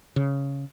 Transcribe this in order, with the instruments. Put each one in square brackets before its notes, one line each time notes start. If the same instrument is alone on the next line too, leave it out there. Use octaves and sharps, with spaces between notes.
[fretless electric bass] C#3